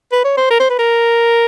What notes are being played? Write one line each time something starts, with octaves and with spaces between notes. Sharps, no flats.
B4
C#5
C5
A#4
C5
B4
A#4